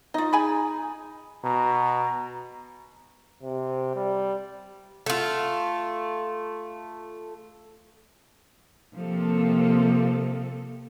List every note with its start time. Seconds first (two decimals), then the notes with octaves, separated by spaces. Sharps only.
0.14 D#4 F4 D#5
0.33 G#4 G#5 B5
1.44 B2 A#5
3.43 C3
3.96 G3
5.06 A3 F4
8.95 C3 F3 A#3 C4 A4